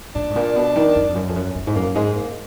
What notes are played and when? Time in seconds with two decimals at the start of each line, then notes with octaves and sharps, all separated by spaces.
0.15 A#2 D4
0.30 G#2
0.36 A#2
0.56 B2
0.76 D#3
0.96 F#2
1.09 F2
1.15 F#2
1.28 F2
1.36 F#2
1.55 F#2
1.67 G#2
1.76 F#2 A#3
1.95 G#2 G#3
2.15 A#3